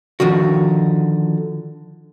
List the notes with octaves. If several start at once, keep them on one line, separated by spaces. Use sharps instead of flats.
D3 D#3 F3 F#4